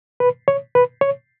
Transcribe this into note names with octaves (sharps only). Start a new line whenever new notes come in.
B4
C#5
B4
C#5